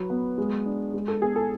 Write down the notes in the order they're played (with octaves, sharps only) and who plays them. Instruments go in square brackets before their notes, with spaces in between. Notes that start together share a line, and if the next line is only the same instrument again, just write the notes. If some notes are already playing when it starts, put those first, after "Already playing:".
Already playing: [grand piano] F#3 [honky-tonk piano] B4
[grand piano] B3
G#3
D4
G#3
[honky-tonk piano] A4
[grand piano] B3 [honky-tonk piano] G#4
[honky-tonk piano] A4